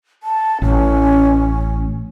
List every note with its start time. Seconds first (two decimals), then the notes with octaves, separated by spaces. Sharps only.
0.23 A5
0.62 A1 C#4